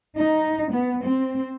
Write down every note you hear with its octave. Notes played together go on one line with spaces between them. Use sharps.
D#4
B3
C4